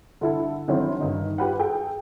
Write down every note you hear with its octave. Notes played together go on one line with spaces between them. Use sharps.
D3 E4 A4
D3 D#3 F#3 C4 C#4 E4
G2 D#3 D#4
F4 G4 B4 F#5
G#4 A4 G5